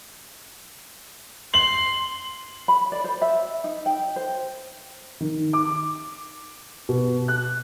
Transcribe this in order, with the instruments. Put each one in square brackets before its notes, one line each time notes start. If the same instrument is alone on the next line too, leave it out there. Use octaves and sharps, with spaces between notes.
[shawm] C6 [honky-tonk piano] F#7
[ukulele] B5
D5
C5
E5
D#4
G5
C5
[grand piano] D#3
D6
B2
F#6